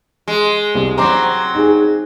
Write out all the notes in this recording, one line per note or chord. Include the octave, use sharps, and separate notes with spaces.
G#3
C2
F#3 C4 A#5 C6 D6
D#4 G#4